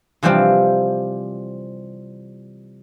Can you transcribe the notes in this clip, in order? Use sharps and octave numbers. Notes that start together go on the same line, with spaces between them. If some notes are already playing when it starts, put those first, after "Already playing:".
C3 E3 F3 G3 C4